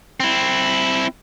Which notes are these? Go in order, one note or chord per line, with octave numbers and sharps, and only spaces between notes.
C4 E4